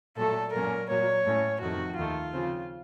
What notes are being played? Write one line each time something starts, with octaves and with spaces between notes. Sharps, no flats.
A#2 F#3 A3 A4
A#2 F#3 A#3 C#4 A#4
A#2 F#3 A#3 C#5
A2 A3 C#4
F2 C3 D#3 A3 F#4
D#2 D#3 A3 F4
C#3 F3 C4